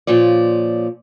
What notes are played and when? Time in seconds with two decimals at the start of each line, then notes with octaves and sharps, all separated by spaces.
0.07 A#2 F3 C#5 D5